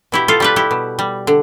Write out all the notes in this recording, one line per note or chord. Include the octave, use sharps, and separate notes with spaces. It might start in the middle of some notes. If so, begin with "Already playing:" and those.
B2 E4 G4
F4 A4
G3 G4 B4
E4 G4
B2
G3
D3